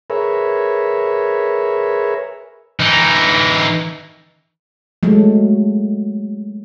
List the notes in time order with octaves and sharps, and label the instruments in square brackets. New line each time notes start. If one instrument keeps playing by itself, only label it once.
[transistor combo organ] G#4 A#4 B4 C#5 E5
[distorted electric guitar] E3 D#4
[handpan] F#3 G#3 A3